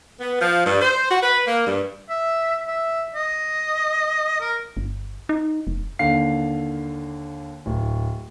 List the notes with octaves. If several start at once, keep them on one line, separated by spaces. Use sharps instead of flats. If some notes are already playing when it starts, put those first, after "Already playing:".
B3
F3
G2
C5
F#4
B4
A#3
G2
E5
E5
D#5
A#4
G1
D#4
F1
D#2 D3 F5 C7
D1